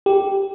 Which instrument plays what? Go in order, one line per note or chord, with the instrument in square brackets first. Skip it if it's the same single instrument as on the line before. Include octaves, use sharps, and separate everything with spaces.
[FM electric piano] G4